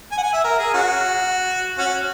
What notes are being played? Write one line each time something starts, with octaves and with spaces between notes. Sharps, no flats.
G#5
F#5
G#5
E5
A#4
G#4
C#4 F#4
C#4 F#4